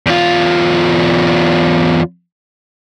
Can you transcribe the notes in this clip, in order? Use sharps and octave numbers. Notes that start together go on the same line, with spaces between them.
E2 F4